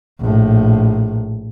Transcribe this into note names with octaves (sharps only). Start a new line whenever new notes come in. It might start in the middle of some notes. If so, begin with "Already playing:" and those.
A#1 A2